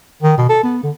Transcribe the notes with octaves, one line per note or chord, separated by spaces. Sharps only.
D#3
B2
A4
B3
D3